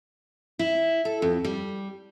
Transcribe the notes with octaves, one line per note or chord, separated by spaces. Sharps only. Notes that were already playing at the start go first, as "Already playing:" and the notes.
E4
A4
F2
G3